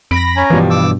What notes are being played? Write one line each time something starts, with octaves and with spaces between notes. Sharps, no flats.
F2 B5 A#6 D7
C#4 G#5 A#5
G2 B2 E3 F3 G3
D6 E6